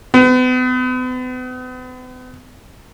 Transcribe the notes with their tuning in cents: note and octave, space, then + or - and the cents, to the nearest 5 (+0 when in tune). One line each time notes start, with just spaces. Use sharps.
B3 +40